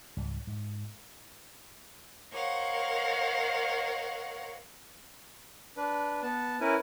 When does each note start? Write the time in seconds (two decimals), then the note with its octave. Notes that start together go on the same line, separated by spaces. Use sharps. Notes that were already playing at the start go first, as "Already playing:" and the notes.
0.17 C#2 G#2 G3
0.47 G#2
2.33 A#4 C5 C#5 D#5 F5 F#5
5.77 D4 B4
6.23 B3 A5
6.61 C#4 E4 A#4 B4 G#5